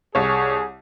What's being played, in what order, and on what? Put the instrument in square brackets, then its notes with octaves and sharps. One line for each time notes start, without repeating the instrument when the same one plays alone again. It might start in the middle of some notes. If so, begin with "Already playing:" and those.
[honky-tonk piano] C2 C#5 [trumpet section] G#4